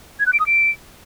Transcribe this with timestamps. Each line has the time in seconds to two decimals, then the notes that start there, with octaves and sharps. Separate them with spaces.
0.20 G#6
0.26 F#6
0.33 D7
0.40 D#6
0.46 D7